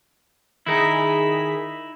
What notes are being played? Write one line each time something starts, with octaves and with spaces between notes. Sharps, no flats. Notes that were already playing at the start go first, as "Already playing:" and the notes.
D#3 D#4 E4 G#4 B6